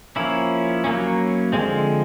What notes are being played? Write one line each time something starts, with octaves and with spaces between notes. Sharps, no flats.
F3 A#3 C#4 E4
F#3 A#3 C#4
D3 F3 G#3 C4